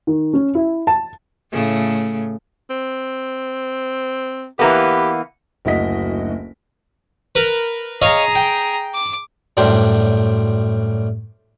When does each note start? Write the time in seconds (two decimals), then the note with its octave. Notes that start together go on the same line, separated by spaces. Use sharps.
0.07 D#3
0.33 C#4
0.55 E4
0.87 A5
1.51 A2 C#3 A3
2.70 C4
4.59 E3 A#3 B3 G4
5.65 F#1 D2 E4 F#4 D#5 B6
7.35 A#4 B4
8.02 G#4 C#5 D#5 F5 A#5
8.35 G5
8.95 D6
9.57 F#2 A2 G3 D4 C5